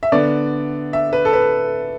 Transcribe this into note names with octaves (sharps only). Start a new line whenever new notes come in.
E5
D3 B3 D5
E5
B4
A4
B4